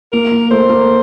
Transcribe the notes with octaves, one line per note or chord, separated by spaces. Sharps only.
A#3 A#4
A#3
A3 C5
A#3